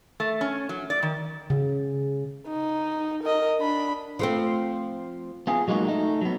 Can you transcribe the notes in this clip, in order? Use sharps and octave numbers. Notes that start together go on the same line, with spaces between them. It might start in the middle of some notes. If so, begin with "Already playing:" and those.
A3
C#4
F#3
D5
D#3
C#3
D#4
A#4 D#5
D4 B5
F3 A3 C4
B3 F4 G#4
F#3 G#3 A#3 D#4 F#4
A3 D#4
F#3 B3